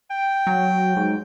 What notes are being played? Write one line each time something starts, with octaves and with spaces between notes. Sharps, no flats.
G5
F#3
G#2